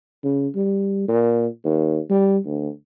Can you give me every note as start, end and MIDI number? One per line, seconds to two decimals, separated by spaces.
0.24 0.48 49
0.55 1.05 55
1.08 1.47 46
1.64 1.99 39
2.10 2.38 55
2.45 2.69 38